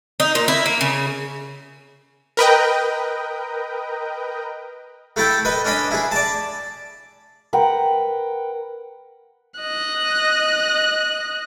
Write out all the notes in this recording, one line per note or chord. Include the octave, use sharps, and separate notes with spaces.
D#4
A#2
E4
A#3
C#3
A#4 B4 D#5 G5
A3 E4 A4 G5
B4 D#5
C#4 D4 D#5 B5
E4 G#4
D5 A5
A#4 B4 F#5 G5
D#5 F#6